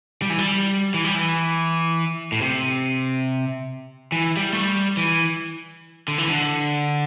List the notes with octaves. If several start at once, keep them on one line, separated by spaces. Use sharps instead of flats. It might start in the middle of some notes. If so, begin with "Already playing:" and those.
G3
E3
G3
E3
G3
E3
A2
C3
E3
G3
A3
G3
E3
D3
E3
D3